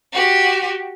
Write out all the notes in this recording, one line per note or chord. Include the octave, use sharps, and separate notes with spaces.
F#4 G4